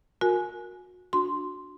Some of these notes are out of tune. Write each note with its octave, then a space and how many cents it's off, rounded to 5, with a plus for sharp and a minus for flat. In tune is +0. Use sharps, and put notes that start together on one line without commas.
F#4 -30 A#4 +0 G#5 +15
D4 +0 F#4 -25 C6 +0